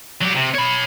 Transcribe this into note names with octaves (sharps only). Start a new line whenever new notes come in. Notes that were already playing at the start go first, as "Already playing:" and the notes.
F#3 G4
C3
C#5 B5